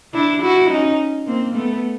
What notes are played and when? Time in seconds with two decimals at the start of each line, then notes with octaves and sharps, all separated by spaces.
0.14 D4 E4
0.42 E4 F#4
0.70 C#4 D#4
1.27 A#3 C4
1.55 A3 B3